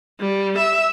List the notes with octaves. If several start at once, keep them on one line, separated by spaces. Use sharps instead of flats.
G3
E5